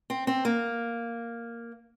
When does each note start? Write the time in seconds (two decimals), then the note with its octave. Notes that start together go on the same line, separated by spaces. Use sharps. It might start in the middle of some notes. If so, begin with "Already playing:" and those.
0.10 C4
0.27 C4
0.45 A#3